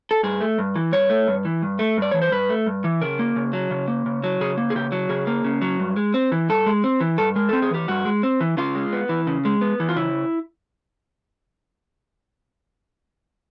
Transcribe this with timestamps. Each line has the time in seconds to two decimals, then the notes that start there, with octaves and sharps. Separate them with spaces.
0.11 A4
0.23 G2 G#4
0.41 A3
0.58 G2
0.76 E3
0.92 G2 C#5
1.10 A3
1.27 G2
1.45 E3
1.62 G2
1.79 A3
1.98 G2 D5
2.11 E3 C#5
2.22 C5
2.31 G2 B4
2.49 A3
2.67 G2
2.84 E3
3.01 C#3 A#4
3.19 A#3
3.36 C#3
3.53 F#3
3.71 C#3
3.88 A#3
4.06 C#3
4.24 F#3
4.41 C#3 G#4
4.58 A#3
4.70 G#4
4.75 C#3 G4
4.92 F#3
5.09 C#3 G#4
5.27 A#3
5.44 C#3
5.62 F#3
5.80 G2
5.96 G#3
6.14 C4
6.32 E3
6.49 G2 A4
6.66 G#3
6.84 C4
7.01 E3
7.18 G2 A4
7.36 G#3 A#4
7.49 C4 A4
7.62 G#4
7.71 E3 G4
7.88 G2 F#4
8.05 G#3
8.23 C4
8.41 E3
8.57 C#3 F4
8.75 G#3
8.93 B3
9.09 E3
9.27 C#3
9.45 G#3
9.61 B3
9.80 E3
9.89 F4
9.96 C#3 E4